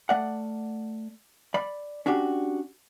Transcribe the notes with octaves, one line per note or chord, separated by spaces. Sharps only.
A3 D5 F#5
D5 B5
C#4 D4 F#4 G4